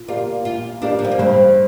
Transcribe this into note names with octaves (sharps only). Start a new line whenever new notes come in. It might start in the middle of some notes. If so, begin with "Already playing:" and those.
Already playing: A#2
A#3 F4 G4 D5 F5
A#2 F4
A#3 D4 G4 D5 F5
F3
G3
A#3
G2 C4